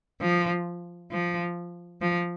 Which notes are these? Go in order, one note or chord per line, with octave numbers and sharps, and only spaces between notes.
F3
F3
F3